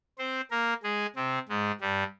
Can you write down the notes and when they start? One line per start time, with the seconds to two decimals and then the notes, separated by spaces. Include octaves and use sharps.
0.18 C4 C5
0.51 A#3 A#4
0.83 G#3 G#4
1.16 C3 C4
1.49 G#2 G#3
1.81 G2 G3